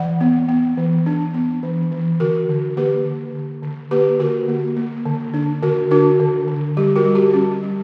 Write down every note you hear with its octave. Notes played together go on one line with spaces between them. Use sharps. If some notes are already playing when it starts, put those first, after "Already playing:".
Already playing: E3 D5 F#5
B3
B3
E3
D4
B3
E3
E3
D3 F#4 A#4
D3
A#3 G4 B4
D3
D3
D3
A#3 G4 B4
D3 F#4 A#4
A#3
A#3
D3
D4
D3 F#4 A#4
D4 F#4 A#4
D3
D3
G3 G4
F#4 A#4
G3
G4
C#4
G3